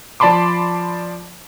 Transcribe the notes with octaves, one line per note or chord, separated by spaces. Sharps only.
F3 D5 A5 B5 C6 D6